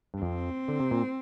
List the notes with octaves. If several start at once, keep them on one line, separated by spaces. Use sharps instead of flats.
G2
F2 C4
D3
C3
A#2